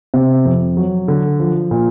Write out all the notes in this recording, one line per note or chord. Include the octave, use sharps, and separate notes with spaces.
C3
F2
F#3
D3
F3
A#2